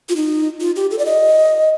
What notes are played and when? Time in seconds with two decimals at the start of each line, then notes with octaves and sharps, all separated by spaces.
0.09 F4
0.16 D#4
0.61 F4
0.76 G4
0.91 A4
0.99 D5
1.06 D#5